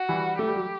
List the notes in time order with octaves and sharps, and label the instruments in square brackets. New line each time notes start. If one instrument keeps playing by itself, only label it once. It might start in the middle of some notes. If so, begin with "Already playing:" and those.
Already playing: [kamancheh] F#4
[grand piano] E3 G3
[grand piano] A3 [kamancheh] G4
[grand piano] G3
F#3